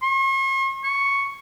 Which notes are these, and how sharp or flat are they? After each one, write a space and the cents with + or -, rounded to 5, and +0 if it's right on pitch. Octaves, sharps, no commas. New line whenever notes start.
C#6 -45
C#6 +0